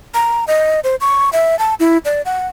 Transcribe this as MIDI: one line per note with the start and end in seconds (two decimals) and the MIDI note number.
0.14 0.45 82
0.48 0.80 75
0.84 0.96 72
1.01 1.30 85
1.33 1.58 76
1.59 1.74 81
1.80 1.98 64
2.05 2.22 74
2.25 2.47 78